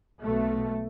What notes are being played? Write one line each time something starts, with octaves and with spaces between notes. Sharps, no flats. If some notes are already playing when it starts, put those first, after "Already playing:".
B1 B2 A3